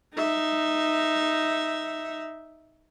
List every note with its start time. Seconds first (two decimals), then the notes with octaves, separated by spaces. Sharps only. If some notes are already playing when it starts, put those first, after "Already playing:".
0.15 D#4 E5